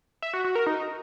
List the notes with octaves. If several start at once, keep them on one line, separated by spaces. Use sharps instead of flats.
E5
F#4
F#4
A#4
D#4